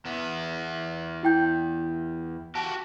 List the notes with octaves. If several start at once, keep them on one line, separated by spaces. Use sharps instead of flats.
E2 B3
E4 G5 G6
F#4 G4 A5